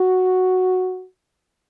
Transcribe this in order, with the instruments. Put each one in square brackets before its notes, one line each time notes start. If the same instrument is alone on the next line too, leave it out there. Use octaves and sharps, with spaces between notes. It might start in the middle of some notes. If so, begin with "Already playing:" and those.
Already playing: [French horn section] F#4